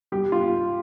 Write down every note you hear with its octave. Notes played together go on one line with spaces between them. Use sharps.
G3 G4
F4